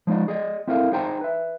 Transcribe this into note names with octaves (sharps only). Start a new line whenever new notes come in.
F3 G#3 D#4 D5
G#4 D5 D#5
C4 E4 A4 A#4 C#5 F5
D#4 G#4 C5 G5 G#5 A#5
B4 E5